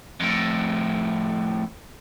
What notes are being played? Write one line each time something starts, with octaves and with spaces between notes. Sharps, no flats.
F2 A2